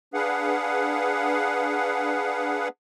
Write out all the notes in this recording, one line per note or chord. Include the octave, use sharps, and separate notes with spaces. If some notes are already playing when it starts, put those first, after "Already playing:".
D4 G#4 B4 F5 F#5